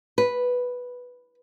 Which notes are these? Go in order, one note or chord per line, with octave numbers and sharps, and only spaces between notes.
B4